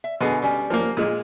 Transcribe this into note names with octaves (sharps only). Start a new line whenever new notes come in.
E5
B2 D3 G#4 G#5
G3 C#4
F3 A#3
A#2 G#3